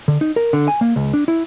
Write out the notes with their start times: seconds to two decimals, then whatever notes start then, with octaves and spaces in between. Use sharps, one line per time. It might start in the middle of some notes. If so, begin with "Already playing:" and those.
0.08 D3
0.21 D#4
0.36 A#4
0.53 D3
0.68 G#5
0.81 A#3
0.96 C#2
1.14 D4
1.28 E4